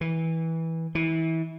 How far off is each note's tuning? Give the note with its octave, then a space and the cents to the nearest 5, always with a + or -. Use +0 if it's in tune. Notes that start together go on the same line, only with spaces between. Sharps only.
E3 -15
E3 -25